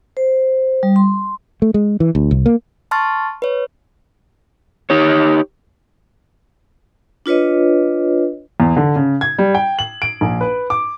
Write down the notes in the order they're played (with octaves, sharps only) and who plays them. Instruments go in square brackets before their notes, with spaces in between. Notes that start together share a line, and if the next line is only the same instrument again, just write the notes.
[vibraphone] C5
G3
C6
[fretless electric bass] A3
G#3
E3
D2
C2
A#3
[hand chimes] A5 C6 C#6 F6 A6
B4 C#5
[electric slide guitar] D#4 G4 C#5
[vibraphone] D4 F4 B4 C#5 D#5
[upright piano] E2
D3
C#3
G#6
G3
G5
F#7
D7
A#1
B4
D6